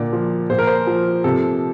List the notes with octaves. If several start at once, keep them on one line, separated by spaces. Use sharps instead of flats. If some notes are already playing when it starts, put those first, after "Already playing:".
Already playing: A#2 D3 D5
F3
A#2 C5
A#4
C5
F3
C3 A4